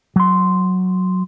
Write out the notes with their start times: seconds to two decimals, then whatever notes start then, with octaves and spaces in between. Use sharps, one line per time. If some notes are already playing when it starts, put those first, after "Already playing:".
0.16 F#3 C6